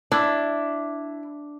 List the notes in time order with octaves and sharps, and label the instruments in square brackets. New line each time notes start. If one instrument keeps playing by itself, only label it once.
[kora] D4 [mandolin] E4